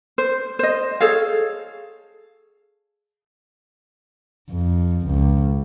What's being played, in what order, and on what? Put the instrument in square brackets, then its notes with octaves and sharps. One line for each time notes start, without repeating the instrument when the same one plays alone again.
[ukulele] C5
C5 D#5
G#4 A4 C#5 F5
[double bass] F2
C#2